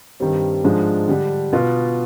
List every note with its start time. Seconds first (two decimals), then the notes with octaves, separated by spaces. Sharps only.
0.20 G2 D#3 G3 C4
0.64 G#2 F3 G#3 D4
1.08 D3 G3 D4
1.53 B2 B3 F4